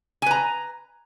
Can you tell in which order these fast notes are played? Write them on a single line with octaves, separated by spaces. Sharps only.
G#5 B4 A#5